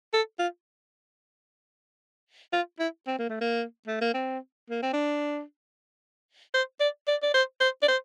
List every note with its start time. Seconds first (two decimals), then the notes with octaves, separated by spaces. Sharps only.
0.13 A4
0.39 F4
2.53 F4
2.79 E4
3.07 C4
3.19 A#3
3.29 A3
3.41 A#3
3.87 A3
4.01 A#3
4.14 C4
4.70 A#3
4.82 C4
4.93 D4
6.54 C5
6.80 D5
7.08 D5
7.23 D5
7.34 C5
7.60 C5
7.83 D5
7.88 C5